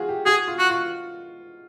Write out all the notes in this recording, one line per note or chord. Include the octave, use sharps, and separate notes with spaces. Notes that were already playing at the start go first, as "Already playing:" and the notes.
Already playing: F4 F#4 G#4
G4
F#4 G#4
F4
F#4
F4